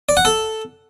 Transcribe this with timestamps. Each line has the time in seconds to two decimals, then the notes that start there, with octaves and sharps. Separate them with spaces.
0.09 D5
0.17 F#5
0.25 A4